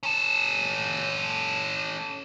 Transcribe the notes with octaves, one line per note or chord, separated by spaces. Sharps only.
C#4 A4